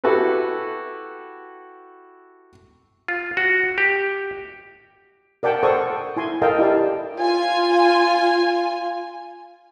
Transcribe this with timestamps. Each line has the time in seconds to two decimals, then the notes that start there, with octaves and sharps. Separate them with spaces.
0.04 E4 F#4 G4 A4 B4
3.08 F4
3.37 F#4
3.78 G4
5.43 A#4 D5 F#5 G5 A5
5.63 A4 C5 F#5 C#6 D#6
6.16 E4 G#5 C6
6.42 A4 A#4 D#5 F5 G5 A5
6.59 E4 G4 D5 A5
7.17 F4 G#5